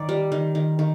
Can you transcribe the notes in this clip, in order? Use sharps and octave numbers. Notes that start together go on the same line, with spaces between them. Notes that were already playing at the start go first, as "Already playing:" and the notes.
Already playing: D#3 D5
G3
D#3
D#3
D#3